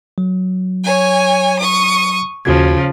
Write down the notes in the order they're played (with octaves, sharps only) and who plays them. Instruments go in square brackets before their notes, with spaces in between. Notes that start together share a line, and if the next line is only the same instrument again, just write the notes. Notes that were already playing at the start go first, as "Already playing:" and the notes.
[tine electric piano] F#3
[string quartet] C#5 G#5
C#6 D#6
[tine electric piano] D#2 F#4 G#6 [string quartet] C#3 F3